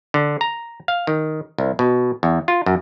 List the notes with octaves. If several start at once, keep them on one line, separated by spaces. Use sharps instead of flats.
D3
A#5
F5
D#3
C2
B2
E2
F4
F#2